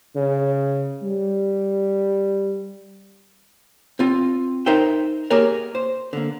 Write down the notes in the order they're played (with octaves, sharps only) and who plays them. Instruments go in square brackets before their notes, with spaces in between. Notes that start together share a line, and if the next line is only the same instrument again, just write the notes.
[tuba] C#3
G3
[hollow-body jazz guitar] C4 F4
D#4 A#4 C5 E5 G5
A#3 G4 G#4 A#4 C#5
C5
D3 A#3